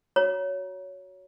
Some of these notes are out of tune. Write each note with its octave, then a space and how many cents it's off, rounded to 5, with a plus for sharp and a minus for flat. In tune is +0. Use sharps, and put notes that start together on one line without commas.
F#4 +0 C#5 +10 A#5 +25